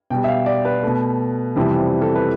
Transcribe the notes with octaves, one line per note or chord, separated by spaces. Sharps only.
B2 G3 G5
E5
F5
D5
B4
B2 A3
F2 C3 E3 G3
A4
B4